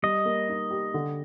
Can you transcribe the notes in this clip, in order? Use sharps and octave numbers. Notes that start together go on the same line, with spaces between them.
G3 D#5
A#3
D#4
G4
D3